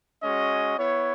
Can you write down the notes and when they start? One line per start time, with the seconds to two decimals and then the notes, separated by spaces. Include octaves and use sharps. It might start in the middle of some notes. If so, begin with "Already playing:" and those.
0.22 G#3 C#4 F#4 D#5
0.78 B3 E4 C#5